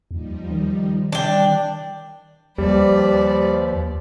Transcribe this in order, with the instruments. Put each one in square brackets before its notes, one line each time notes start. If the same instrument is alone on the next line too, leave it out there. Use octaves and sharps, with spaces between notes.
[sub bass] D#2 [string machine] F3 G3 D#4
[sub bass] D#3
[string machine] E3 G3 [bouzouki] D4 G5
[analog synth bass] D#2 [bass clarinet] F3 [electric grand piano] G3 [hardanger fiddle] B4 D5